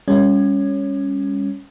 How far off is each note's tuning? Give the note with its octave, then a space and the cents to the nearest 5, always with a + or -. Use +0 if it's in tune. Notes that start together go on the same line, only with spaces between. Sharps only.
G3 +45 C#4 +0